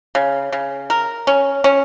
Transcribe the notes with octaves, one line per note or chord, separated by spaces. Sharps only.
C#3
C#3
A#4
C#4
C#4